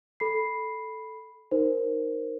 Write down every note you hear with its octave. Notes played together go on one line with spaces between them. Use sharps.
A4 B5 C7
D#4 A#4 C5